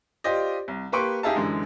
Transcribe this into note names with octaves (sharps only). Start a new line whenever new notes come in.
F4 G4 C5 D5 D#5
C2
A#3 G4 B4 C6 C#6 D7
D#4 G4 G#4 E5 F5 A5
F#2 D3 E3 G#3